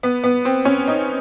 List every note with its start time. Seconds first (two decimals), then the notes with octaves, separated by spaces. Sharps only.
0.03 B3
0.24 B3
0.45 C4
0.65 C#4
0.88 D#4